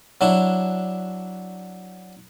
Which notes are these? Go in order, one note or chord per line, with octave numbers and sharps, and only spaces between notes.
F#3 D4 E4